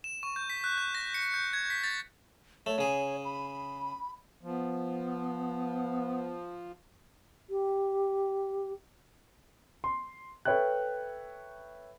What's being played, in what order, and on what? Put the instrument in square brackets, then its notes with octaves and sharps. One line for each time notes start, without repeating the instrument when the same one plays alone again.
[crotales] E7
C#6
G6
B6
F#6
G6
A#6
C#7
G6
G#6
B6
A6
[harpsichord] A3 [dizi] C#5
[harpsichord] C#3 G#4
[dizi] B5
[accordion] F3 [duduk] B3
[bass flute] G4
[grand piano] C6
A4 B4 C#5 E5 G5 F#6